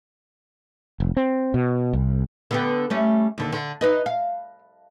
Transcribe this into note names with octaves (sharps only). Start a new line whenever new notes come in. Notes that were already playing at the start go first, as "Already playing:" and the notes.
F1
C4
B2
C2
D3 B3 G4
G3 A3 C#4
D#2 D3
D3
D#4 B4 D#5
F5